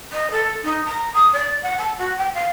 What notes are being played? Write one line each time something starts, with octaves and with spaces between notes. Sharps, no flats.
D#5
A4
D#4
A#5
D#6
D5
F#5
A5
F#4
G5
F5